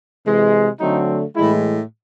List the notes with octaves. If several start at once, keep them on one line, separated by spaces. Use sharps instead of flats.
C3 E3 G#3
D3 F#3 A3 C4 D#4
A2 E3 G#3 E4